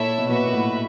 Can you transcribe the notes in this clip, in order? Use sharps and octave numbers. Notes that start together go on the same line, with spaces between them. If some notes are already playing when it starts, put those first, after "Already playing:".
Already playing: A#2 E4 A4 C#5 E5
B2
A#2 F#4 B4 E5
A#2
A2